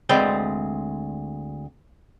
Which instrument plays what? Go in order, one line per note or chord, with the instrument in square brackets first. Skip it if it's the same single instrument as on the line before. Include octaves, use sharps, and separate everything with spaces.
[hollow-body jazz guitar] D2 G#3 C4 B4 D5 G5